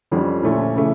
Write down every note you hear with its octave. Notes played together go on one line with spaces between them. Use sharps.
F2 D3 G3 C#4
A#2 F3 A3 C#4
C#3 E3 A3